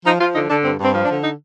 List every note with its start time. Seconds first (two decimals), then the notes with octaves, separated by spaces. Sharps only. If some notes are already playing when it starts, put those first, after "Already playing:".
0.06 F3 D#4
0.20 F3 F4
0.35 D3 D#4
0.50 D3 D4
0.65 G2 C4
0.80 G2 C4
0.94 F3
1.04 D4
1.09 D3
1.24 D#4